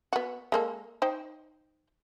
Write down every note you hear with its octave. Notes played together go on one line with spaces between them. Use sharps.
B3 F#4
G#3 A#3 A4
D#4 C5 G5